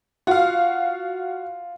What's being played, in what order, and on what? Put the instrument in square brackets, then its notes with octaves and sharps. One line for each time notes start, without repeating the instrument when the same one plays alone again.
[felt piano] F4 [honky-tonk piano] F#4 F5